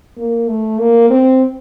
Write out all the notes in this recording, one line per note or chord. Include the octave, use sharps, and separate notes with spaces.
A#3
A3
A#3
C4